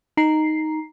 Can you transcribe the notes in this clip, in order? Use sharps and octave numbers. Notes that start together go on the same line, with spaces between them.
D#4 A#5 C7